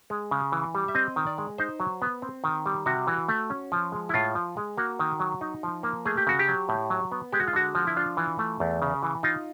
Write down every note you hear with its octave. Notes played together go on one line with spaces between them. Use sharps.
G#3
C#3
E3
G3
E5
C4 D#5
D#3
D5
G#3
D#4 C5
F#3
B3
C4
D#3
G3
C3 F#4
E3
A3
C#4
F3
G#3
E4
A2 F4
F3
G#3
A#3 F#4
D#3
F#3
D#4
F3
A#3
A3 G#4
G4
C#3 F#4
G4
F#3
A2
F#3
B3
G#3 G4
F#4
F4
D3 F#4
F3
E4
D4 F4
E3
A3
E2
C#3
E3
D#4 F4